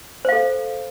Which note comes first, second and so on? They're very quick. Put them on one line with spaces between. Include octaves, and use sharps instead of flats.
C5 F5 A4